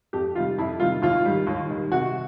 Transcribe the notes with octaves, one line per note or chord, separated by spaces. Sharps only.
F2 G4
C3 D#3 G3 F4
F2 E4
C3 D#3 G3 F4
D#2 F4
D#3 G3
D#2
D#3 G3
C3 F#4